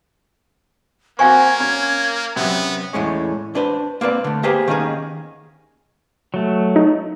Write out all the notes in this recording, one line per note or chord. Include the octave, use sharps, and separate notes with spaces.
A#3 C4 F#4 F5 G#5 C#6 G#6
C#4
F#2 C3 B3
E2 A2 G#3 C#4
D4 B4 C5
A#3 C4 B4 D5
D3 A3
A#3 G4 G#4 B4 C5
D#3 A#3 C#4 D#4 G#4
F#3 A3
D#4